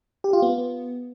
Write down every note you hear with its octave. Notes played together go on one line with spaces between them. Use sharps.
G4
F4
B3